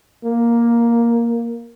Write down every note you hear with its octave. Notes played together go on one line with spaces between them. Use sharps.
A#3